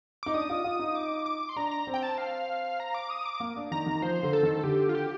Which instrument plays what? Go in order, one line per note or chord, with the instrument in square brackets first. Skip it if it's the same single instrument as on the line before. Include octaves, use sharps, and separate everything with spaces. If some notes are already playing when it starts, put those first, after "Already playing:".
[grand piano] D#4 [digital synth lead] D6
[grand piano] D4 [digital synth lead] D#6
[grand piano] F4
F4
D#4
[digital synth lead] D6
D6
C6
[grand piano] D4 [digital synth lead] A#5
[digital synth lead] A#5
[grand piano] C4
[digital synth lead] G5
A5
F5
A#5
D6
D#6
D6
[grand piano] A#3
D4
[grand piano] D#3 [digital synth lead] A#5
[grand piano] D#3
[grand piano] F3 [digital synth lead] C5
[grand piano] D3
[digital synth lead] A4
[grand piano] D#3
[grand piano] D3 [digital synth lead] G4
[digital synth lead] F4
G4